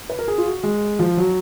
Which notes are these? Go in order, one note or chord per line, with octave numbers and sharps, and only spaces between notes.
B4
A#4
G#4
F4
F#4
G#3
F3
F#3